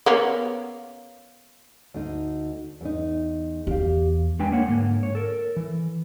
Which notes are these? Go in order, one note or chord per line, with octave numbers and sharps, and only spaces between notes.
A#3 B3 C#4
D2 D#4
E2 D#4
E2 G4 F5
G#3 D4 B4 G5 G#5
A#3 C#5 F#5
G#2 D3 A#3
C#5
A4 A#4
E3